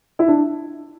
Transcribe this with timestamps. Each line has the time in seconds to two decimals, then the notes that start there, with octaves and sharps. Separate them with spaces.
0.19 E4
0.28 D4